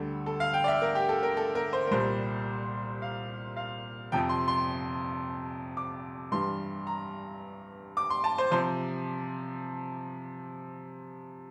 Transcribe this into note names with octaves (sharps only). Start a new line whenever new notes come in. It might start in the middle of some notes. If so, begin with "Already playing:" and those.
Already playing: D2 D3 G3 A4
A4
F5
G5
D5
E5
A#4
G4
A4
A#4
A4
A#4
C5
A#4
C2 A#2 G3 C5
F5
F5
F2 C3 F3 G5
C6
C6
D6
G2 E3 G3 C6
A#5
D6
C6
A5
C5
C3 F3 C5